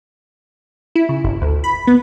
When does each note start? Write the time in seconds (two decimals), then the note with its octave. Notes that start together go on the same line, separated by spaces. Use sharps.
0.95 E4
1.09 C#3
1.24 G1
1.42 D2
1.64 B5
1.87 B3